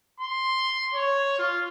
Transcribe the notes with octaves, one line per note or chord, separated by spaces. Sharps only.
C6
C#5
F4